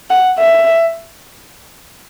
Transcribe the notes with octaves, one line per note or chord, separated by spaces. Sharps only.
F#5
E5